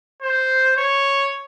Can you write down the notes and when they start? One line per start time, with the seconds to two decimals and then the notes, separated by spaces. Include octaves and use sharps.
0.22 C5
0.77 C#5